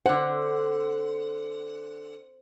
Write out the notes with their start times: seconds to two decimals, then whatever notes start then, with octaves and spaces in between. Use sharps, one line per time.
0.06 D3 C5 F#5